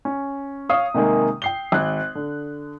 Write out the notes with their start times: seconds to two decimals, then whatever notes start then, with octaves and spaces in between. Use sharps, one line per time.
0.05 C#4
0.69 C#5 F5 D#6
0.94 C3 D#3 G#3 A#3
1.42 G5 C7 G7
1.72 G#1 F#6
2.15 D3